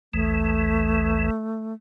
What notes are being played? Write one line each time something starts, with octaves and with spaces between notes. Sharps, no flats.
A1 D#2 E3 A3